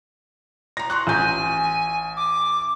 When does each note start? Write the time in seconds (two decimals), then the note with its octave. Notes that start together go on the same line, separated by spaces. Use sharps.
0.77 A#5 A#6
0.90 C6 C#6 F#6
1.07 A1 G#5 G6
2.17 D6